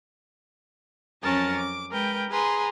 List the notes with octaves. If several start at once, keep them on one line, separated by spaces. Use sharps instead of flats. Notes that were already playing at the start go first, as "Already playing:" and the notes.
F2 F#3 C#4 A#4 A5 A6
D6
G#3 A#4 B4 G5
G#4 B4 G#5 A#5 C6